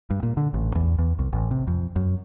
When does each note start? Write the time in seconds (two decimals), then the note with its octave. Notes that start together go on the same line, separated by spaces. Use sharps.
0.10 G2
0.23 A#2
0.37 D3
0.54 A1
0.75 E2
0.99 E2
1.19 C2
1.33 A1
1.51 C3
1.67 F2
1.96 F#2